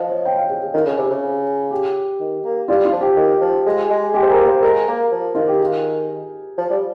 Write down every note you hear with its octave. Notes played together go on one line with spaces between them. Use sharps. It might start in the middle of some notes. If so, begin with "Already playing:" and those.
Already playing: F3 D#5 F5
C#5
G5
F5
G#4
G#4
D#3 F4
C#3
C3
C#3
G4
D#3
A#3
G3 F4
F4
F3
G4
D#3
F3
G#3
G#3
G#3 G4
C5
A#4
A#3
C5
G#3 A#4
A#3
F3
D#3 F4
G4
G#4
F3
G3